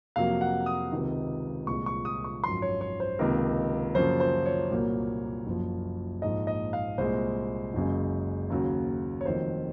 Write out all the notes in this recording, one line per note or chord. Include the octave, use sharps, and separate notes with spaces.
F2 C3 F#3 A#3 F5
F#5
D#6
C#2 C3 D#3
C2 A#2 G#3 C#6
C#6
D#6
C#6
G#1 F#2 F3 C6
C#5
C#5
C5
C#2 C3 D#3 A#3 A#4
F#2 C#3 F3 A#3 C5
C5
C#5
C2 A#2 F#3 A#3
F#1 F#2 F3
A#1 G#2 F3 D#5
D#5
F5
C2 A#2 G#3 C5
F#1 F#2 C#3 G#3
D#2 C#3 F#3
C#5
F1 F2 D#3 F#3 C5